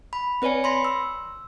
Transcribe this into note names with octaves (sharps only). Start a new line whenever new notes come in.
B5
C4 B4 C#5 D5 G#5 C#7
B5 C6 A#6
E6